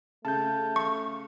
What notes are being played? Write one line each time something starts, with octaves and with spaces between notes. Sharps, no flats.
C#3 A3 A5 G6
C#6